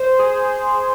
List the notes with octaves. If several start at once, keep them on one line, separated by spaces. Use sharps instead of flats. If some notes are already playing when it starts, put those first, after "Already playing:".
Already playing: C5
G#4